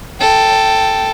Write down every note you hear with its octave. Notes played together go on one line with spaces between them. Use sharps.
A4 G5